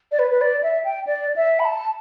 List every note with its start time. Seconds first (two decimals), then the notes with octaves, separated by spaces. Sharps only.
0.12 D5
0.19 B4
0.31 B4
0.41 D5
0.63 E5
0.84 G5
1.07 D5
1.36 E5
1.59 B5
1.65 A5